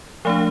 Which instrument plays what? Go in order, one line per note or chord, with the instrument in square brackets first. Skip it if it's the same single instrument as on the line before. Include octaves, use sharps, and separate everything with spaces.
[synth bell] F3 A3 D4 F5